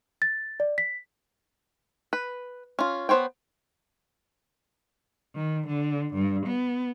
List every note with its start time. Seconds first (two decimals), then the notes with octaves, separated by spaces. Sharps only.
0.22 A6
0.60 D5
0.78 B6
2.13 B4
2.79 C#4 F4
3.09 B3 C5 C#5 G5
5.36 D#3
5.68 D3
6.15 G2
6.47 B3